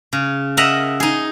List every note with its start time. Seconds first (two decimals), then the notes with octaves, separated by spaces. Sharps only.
0.13 C#3
0.57 A#4 D#5 E5 F#5 A#5
1.00 D#4 G#4